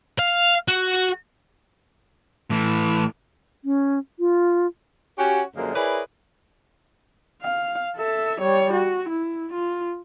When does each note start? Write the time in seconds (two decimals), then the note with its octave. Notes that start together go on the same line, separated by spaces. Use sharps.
0.19 F5
0.68 F#4
2.50 A2 E3
3.64 C#4
4.19 F4
5.18 C#4 F#4 G4
5.55 F#2 D3 F3 G#3 A#3
5.74 E4 G#4 A#4 B4 C#5 D5
7.43 F5
7.96 A4 E5
8.40 G3 C#5
8.73 F#4
9.09 E4
9.53 F4